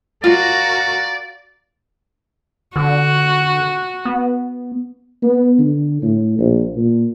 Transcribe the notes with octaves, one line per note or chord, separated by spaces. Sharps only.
F4 F#4 A#4 D5
D3 F#4
B3
B3
D3
A2
A#1
A#2